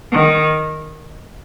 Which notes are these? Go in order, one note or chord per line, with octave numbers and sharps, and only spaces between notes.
D#3